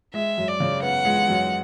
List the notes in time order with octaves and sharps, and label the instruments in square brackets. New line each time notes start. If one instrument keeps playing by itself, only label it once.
[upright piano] G#3 [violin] E5
[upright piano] F#2
[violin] D5
[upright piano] C#3
[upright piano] B3 [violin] F#5
[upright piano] G#3
F#2